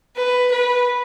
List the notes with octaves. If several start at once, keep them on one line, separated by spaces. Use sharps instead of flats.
B4
B4